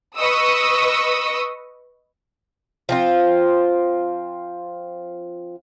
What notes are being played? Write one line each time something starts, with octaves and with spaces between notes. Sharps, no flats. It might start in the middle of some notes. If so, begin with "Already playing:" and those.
B4 D#5 C#6 D#6 E6
F3 C4 F4